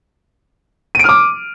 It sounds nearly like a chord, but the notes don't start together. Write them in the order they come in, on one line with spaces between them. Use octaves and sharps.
D#7 D7 F6 D6